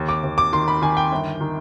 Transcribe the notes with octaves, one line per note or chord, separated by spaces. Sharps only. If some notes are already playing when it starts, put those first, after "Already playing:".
Already playing: D#2
D6
D#2
D6
D#3 C6
B5
D#3 G#5
G5
G1
D#3